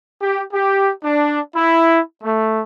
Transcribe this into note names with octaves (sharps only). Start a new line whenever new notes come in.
G4
G4
D4
E4
A3